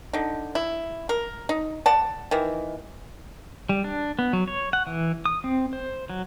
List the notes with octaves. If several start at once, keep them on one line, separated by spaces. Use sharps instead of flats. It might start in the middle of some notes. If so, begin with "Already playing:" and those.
D3 D#4
E4
A#4
D#4
D5 F#5 A5
D#3 E3
G3
D4
B3
F#3
C#5
F#5
E3
D#6
C4
C5
F#3